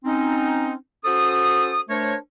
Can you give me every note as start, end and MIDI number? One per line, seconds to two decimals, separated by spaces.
0.05 0.72 60
0.05 0.72 61
0.05 0.72 63
1.05 1.82 61
1.05 1.82 66
1.05 1.82 69
1.05 1.82 72
1.05 1.82 87
1.89 2.15 57
1.89 2.15 62
1.89 2.15 70
1.89 2.15 72
1.89 2.15 73